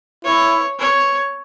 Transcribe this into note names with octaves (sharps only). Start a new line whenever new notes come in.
E4 C#5
C#5